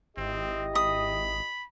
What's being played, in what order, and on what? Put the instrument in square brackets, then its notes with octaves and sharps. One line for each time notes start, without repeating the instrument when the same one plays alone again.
[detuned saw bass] G#1 [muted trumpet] C4 [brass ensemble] E4 G4 D#5
[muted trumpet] B5 [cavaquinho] D#6